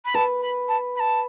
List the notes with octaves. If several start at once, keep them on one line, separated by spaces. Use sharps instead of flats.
B5
B4 A5
B5
A5
B5
A5